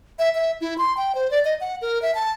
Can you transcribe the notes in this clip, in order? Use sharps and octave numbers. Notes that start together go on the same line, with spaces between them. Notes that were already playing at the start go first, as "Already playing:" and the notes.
E5
E5
E4
C6
G5
C5
D5
D#5
F#5
A#4
E5
A5